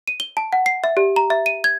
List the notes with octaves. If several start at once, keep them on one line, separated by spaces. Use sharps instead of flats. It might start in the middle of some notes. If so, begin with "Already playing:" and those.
D#7
G7
A5
F#5
C7
E5
G4
A#5
E5
D#7
G#6